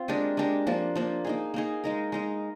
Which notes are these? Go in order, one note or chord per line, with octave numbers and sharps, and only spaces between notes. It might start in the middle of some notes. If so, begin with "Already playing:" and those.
Already playing: C4 F4
G#3 D4 G4 A#4
G#3 D4 G4 A#4
F3 A#3 D4
F3 A#3 D4
A#3 D#4 G#4
A#3 D#4 G#4
G#3 D#4 A#4
G#3 D#4 A#4